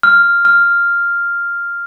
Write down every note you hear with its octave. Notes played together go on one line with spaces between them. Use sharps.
F6
F6